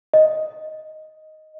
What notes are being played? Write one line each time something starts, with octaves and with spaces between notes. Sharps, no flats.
D#5